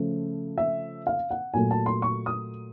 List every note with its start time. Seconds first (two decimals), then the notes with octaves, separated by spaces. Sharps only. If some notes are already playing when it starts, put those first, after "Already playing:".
Already playing: C#3 F3 A3
0.58 E5
1.07 F5
1.31 F#5
1.54 A#2 F#3 A3 G#5
1.71 A5
1.86 C6
2.02 C#6
2.26 D#6